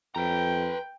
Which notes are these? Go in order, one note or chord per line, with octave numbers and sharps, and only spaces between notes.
F2 B4 G5 A#5